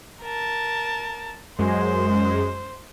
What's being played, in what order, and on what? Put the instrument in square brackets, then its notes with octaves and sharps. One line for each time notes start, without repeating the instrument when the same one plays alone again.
[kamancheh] A#4 A5
[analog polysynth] F#2 G#3 [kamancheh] C5